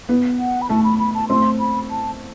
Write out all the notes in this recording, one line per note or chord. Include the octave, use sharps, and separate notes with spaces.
B3
F#5
B5
A3 A5
B5
B5
A5
A3 C4 C6
B5
A5